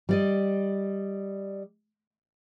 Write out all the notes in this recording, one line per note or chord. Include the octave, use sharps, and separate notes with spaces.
G3 D5 D#5